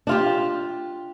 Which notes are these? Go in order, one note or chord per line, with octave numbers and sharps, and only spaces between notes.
D4 F4 G4